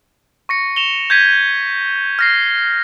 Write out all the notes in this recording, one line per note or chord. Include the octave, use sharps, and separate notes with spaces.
C#6 A#6 C#7
E7 F7 G7
G6 G#6 B6 D#7
F6 A#6 C7